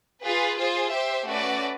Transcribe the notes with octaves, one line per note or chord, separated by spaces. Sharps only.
F4 G#4 B4
F4 G#4 C5
G4 C5 E5
A3 C#4 F#4 B4 D5